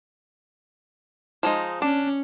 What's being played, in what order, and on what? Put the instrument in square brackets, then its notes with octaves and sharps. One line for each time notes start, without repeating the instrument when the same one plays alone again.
[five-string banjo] F3 G#3 D#4
[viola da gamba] C#4 [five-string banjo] D4